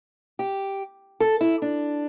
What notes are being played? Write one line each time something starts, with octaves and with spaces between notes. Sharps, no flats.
G4
A4
E4
D4